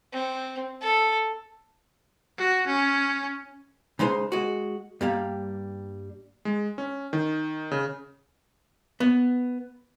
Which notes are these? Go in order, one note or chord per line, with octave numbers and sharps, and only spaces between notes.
C4
A4
F#4
C#4
C#3 G#3 D#4 C5 G#5
G#3 F#4
G2 G3 A#3 F5
G#3
C#4
D#3
C#3
B3